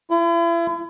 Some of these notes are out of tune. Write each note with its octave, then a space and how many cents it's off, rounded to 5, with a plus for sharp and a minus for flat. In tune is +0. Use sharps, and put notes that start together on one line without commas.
E4 +40